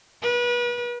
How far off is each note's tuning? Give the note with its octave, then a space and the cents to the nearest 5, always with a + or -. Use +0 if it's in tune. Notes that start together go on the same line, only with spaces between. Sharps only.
B4 -35